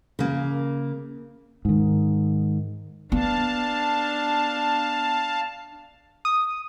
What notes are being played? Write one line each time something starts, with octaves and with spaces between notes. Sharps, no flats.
C#3 A#3
G#2 D#3
B3 D4 F5 A5
D#6